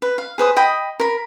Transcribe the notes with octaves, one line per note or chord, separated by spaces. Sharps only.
B4
F5
G#4 B4 C5 D#6
D#5 G5 B5 D#6
A#4 B5